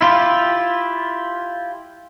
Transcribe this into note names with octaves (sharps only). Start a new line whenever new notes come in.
E4 F4 G4